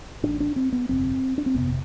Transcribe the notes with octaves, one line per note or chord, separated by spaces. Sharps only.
A1 A2 D4
D4
C4
B3
G1 F2 C3 C4
D4
C4
G1 F2 C3 B3